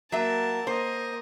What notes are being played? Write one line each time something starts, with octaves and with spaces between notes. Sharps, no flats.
F#3 A#3 E5 A5
A#3 C5 D#5